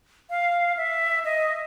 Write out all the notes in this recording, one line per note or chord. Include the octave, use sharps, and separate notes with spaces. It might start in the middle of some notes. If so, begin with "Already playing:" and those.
F5
E5
D#5